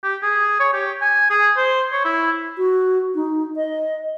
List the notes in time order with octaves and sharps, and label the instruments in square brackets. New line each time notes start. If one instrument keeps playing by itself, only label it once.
[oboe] G4
G#4
C#5
G4
G#5
G#4
C5
C#5
E4
[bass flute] F#4
D#4
D#5